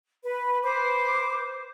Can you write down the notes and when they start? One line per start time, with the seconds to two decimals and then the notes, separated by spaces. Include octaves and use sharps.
0.23 B4
0.63 B4 C5 D6